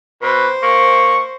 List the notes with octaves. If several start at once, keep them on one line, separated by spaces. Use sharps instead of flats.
B2 B4 C5
A#3 C#6